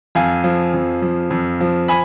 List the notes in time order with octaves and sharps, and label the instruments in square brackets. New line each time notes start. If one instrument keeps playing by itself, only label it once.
[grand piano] F2 F5 G#5
F3
F2
F3
F2
F3
G#5 B5